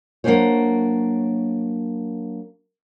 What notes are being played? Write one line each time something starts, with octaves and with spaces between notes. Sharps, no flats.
F#3 A#3 B3 D4 C5 C#5